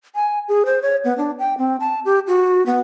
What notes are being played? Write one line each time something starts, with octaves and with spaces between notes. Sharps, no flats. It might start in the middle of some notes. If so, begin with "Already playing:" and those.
G#5
G#4
C5
C#5
B3
D4
G5
C4
A5
G4
F#4
B3